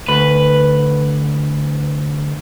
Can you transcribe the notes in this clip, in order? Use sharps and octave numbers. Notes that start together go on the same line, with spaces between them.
D2 B4